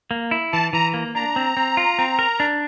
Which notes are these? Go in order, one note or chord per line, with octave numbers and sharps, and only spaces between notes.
A#3
E4
E3 A5
E3 A#5
A#3
D4 A#5
C4
C4
F4
C4
A#4
D4